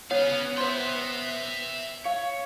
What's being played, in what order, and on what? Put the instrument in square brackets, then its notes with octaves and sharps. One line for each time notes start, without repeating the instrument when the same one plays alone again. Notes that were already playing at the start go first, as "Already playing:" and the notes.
[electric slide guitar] B3 [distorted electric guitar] C#4 F5 [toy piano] C#5 F#5
[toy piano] C5 C6 [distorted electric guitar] E5 G5
[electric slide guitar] C#5 [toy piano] F5